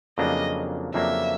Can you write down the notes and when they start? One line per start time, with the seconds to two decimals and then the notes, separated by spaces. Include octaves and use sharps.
0.18 F2 C#3 F#3 A#3 D4 D#5
0.94 F2 C#3 F#3 A#3 D4 E5